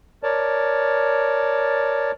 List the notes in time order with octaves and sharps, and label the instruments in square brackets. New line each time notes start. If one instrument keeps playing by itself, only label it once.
[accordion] A#4 C#5 D5 A5